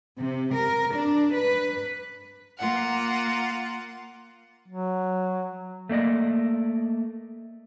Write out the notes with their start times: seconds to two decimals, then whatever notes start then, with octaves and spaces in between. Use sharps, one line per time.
0.18 C3
0.55 A#4
0.95 D4
1.35 B4
2.58 A#3 F4 F#5
4.68 F#3
5.89 A3 A#3 D5 D#5